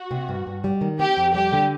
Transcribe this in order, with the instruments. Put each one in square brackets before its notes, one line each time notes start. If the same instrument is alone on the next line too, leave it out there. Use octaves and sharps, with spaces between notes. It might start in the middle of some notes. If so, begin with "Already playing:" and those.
Already playing: [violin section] F#4
[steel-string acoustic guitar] C3
G2
G2
G3
D#3
[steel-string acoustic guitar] C4 [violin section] G4
[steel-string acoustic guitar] F2
[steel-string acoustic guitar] G3 [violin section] G4
[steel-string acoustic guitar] D3